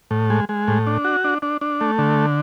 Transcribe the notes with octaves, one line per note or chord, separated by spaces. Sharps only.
A2
G#3
G#3
A2
D4
F#4
D4
D4
D4
A3
D3